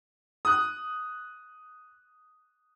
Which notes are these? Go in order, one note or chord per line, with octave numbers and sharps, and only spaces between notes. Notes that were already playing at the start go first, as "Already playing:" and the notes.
D#6 F#6